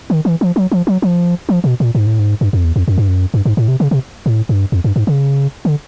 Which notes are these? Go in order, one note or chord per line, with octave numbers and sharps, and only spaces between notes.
D#3
E3
F3
F#3
F3
F#3
F3
F3
B2
A#2
G#2
A2
G#2
G2
F2
E2
F2
F#2
G2
F#2
G2
G#2
A2
C3
C#3
C3
A2
G2
F2
G2
G#2
C#3
D3